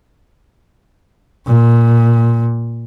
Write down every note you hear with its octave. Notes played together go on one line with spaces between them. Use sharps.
A#2